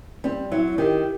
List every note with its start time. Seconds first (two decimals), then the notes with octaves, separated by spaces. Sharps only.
0.24 G3 C4
0.51 F#3 E4
0.78 D#3 G4